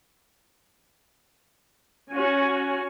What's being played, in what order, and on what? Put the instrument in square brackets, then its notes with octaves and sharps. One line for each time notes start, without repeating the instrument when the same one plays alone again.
[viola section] C#4 F#4 G#5